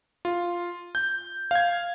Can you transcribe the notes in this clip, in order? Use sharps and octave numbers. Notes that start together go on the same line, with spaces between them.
F4
G6
F5 G#6